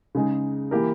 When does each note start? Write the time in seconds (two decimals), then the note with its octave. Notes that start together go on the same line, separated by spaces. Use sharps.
0.15 C#3 G#3 D#4
0.71 E3 A#3 E4 G4 A#4